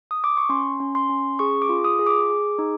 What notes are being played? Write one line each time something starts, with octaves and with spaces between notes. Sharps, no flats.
D#6
D6
C#6
C#4 C6
C#4
C6
C#4
G#4 C#6
D6
F4
D#6
G#4
D6
G#4
D#4